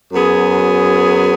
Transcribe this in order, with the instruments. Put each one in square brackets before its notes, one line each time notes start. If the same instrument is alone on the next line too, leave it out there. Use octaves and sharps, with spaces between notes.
[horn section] F#2 F#3 B3 G#4